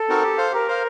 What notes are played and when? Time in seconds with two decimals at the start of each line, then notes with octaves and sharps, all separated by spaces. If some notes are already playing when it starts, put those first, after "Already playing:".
Already playing: A4
0.08 C4 D#4 F#4 A#4
0.23 G4
0.38 C5 F5
0.52 G4 A#4
0.68 C5 F5